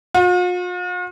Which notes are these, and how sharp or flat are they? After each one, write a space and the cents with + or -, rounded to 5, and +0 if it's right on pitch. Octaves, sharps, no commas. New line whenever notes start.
F4 +45